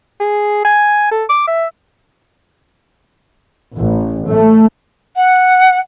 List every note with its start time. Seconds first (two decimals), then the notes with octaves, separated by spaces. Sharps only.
0.20 G#4
0.65 G#5
1.12 A4
1.29 D6
1.47 E5
3.77 A1
4.28 A3
5.16 F#5